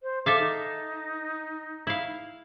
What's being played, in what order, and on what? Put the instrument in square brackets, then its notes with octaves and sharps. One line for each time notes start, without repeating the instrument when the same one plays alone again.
[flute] C5
[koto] A4 E5 F5 [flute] D6
[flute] D#4
[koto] E4 F5